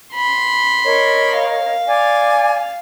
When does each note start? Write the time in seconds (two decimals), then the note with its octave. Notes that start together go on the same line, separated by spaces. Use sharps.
0.14 B5 C6
0.85 A#4 C#5 D#5
1.37 F5
1.87 D5 G#5